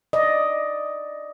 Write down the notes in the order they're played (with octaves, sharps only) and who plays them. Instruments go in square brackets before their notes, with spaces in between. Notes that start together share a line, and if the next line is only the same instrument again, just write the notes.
[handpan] D5 D#5